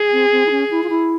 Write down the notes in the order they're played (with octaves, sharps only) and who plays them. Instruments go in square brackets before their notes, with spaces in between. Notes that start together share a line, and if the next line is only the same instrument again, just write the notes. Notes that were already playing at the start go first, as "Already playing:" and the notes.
Already playing: [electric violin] G#4
[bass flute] C4
C4
E4
C#4
E4
F4
E4